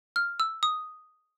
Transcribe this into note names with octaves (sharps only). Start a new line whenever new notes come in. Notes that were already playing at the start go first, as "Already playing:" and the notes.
F6
E6
D#6